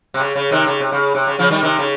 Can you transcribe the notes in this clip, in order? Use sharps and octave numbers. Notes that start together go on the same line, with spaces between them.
C3
C#3
C#3
C3 D#3
C#3
C3
C#3
C3
C#3
C#3 F3
D#3 G3
C3 D#3
C#3